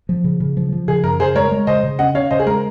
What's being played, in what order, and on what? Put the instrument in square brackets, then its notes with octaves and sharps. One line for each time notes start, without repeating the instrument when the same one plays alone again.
[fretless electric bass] F3
C#3
C#3
F3
F3
[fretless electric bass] C#3 [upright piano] G#4
[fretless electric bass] F#2 [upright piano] A#4
[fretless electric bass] C#3 [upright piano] G#4 C5
[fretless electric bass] G#3 [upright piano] A#4 C#5
[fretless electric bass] G#3
[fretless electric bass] C#3 [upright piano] C5 D#5
[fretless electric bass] C#3
[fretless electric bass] C#4 [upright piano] D#5 F#5
[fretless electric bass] C#4 [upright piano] C#5 F5
[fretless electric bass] C#3 [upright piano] C5 D#5
[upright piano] G#4
[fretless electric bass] G#3 [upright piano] A#4